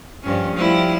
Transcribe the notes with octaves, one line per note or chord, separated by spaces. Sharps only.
G2 F3 C#4
F3 G3 E4